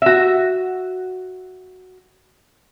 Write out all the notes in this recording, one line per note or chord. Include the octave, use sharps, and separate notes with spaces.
F#4 E5